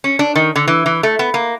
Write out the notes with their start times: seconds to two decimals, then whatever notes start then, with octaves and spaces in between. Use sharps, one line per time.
0.04 C#4
0.19 D4
0.36 D#3
0.56 D3
0.68 E3
0.86 E3
1.03 A3
1.19 B3
1.34 A#3